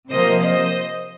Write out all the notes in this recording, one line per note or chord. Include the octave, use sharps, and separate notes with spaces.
C3 F3 A#3 C5 D#5
C5 D#5